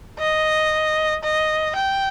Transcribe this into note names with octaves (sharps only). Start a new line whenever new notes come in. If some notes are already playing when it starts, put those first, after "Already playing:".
D#5
D#5
G5